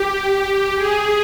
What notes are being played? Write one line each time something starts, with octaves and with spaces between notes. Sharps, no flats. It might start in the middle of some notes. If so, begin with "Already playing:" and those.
Already playing: G4
G#4